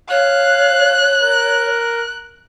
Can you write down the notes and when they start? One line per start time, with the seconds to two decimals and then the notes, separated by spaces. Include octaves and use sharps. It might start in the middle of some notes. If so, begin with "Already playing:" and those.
0.10 C#5 F5 F#6
1.21 A#4